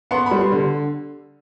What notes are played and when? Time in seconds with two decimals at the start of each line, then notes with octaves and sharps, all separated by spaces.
0.11 B3 C6
0.26 B5
0.31 G3
0.41 C6
0.52 D3